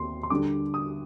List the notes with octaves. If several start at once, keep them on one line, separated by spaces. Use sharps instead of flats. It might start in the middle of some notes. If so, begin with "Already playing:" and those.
Already playing: D#2 C4 C6
C6
D3 G3 D4 D6
D#6